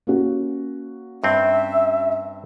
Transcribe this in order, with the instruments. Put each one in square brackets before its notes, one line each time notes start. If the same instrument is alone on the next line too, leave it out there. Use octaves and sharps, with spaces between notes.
[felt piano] A#3 C#4 F#4
[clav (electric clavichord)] G2 C4 [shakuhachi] E5